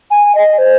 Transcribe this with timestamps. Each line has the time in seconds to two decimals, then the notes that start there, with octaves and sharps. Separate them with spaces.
0.11 G#5
0.35 D#5
0.58 C5